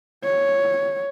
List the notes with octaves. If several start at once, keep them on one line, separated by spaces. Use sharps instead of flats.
C#5